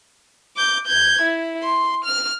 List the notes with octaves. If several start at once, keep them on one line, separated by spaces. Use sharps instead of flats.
D6 G6
G6 G#6
E4
C6
F6